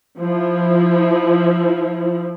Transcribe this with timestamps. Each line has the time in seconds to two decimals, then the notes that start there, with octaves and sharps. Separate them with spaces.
0.18 F3 E4